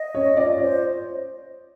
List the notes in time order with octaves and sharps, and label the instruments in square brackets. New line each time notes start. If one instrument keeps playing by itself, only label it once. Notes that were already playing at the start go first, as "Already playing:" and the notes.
Already playing: [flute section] D#5
[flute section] C#4 [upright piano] C#5
[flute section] F4 [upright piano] D5
[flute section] C5 [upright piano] C#5